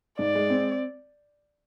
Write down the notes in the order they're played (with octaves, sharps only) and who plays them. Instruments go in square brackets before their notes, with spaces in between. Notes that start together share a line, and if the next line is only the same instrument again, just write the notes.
[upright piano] G#2 [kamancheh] D5
[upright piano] G#3
C4